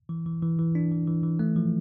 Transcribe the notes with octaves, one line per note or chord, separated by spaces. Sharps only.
E3
E3
E3
E3
D4
E3
E3
E3
A3
F3